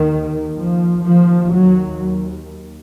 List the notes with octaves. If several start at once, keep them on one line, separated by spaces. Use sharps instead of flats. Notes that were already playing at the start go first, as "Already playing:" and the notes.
Already playing: D#2 D#3
F3
D#2 F3
F#3